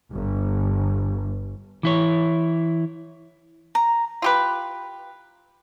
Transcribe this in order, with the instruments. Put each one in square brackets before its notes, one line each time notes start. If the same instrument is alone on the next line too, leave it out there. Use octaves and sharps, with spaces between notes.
[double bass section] G1
[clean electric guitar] E3 E4 C#5
[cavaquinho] A#5
[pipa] F4 G4 B4